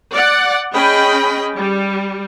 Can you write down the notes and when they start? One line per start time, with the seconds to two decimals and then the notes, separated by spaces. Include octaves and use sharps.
0.14 D5 F#5
0.72 C#4 G#4 D#5 G5 B5
1.55 G3